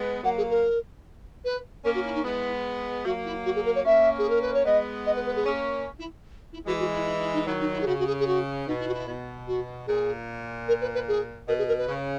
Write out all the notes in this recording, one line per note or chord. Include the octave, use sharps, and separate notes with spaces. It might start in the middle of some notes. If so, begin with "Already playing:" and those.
Already playing: G#3 B3
F#3 A#3 F#5
G#4
A#4
B4
A#3 C#4 A#4
F#4
E4
D#4
G#3 B3 E4
F#3 A#3 F#4
E4
F#4
G#4
A#4
C#5
A#3 C#4 E5
G#4
A#4
B4
C#5
G#3 B3 D#5
D#5
B4
B4
G#4
A#3 C#4
E4
E4
E3 G#3 F#4
F#4
E4
E4
E4
D#4
D#3 F#3 E4
D#4
E4
G#4
C#3 F#4
F#4
G#4
G#4
F#4
B2 D#4
E4
F#4
E4
B2
F#4
A#2 G#4
A#4
B4
B4
G#4
B2 A#4
G#4
A#4
B4
C#3